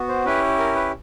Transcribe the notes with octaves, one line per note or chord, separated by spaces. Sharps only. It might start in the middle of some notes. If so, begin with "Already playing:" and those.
Already playing: B3 F#4
C5
C#4 E4 G4 B4
A#4
B4